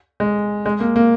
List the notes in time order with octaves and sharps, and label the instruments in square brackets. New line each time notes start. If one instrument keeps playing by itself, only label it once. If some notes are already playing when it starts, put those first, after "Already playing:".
[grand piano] G#3
G#3
A#3
A#3